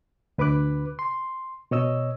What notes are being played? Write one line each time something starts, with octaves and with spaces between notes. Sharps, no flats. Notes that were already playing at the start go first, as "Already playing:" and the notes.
D2 B4 B5 D6 F#6
C6
B2 C#5 D#5 E6